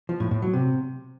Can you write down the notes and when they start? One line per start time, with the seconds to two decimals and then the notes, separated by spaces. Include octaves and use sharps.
0.09 F3
0.20 A2
0.31 A2
0.42 F#3
0.53 C3